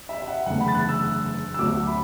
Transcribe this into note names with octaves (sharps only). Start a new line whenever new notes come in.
E5
E5
F#5
F#1 E2 D3 A3 F#5
B5
A6
F#6
E6
E6
D2 D3 F#3 A3 D6
B5